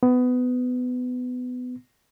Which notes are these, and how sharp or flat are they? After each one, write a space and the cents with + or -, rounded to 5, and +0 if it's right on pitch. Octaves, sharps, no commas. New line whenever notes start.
B3 +20